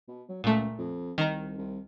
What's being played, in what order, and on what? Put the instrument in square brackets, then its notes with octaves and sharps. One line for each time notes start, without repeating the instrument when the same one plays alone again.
[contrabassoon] B2
F#3
[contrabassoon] C#2 [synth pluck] A#2 A3
[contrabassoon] F2
[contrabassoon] C2 [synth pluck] D#3 A#5
[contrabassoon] C2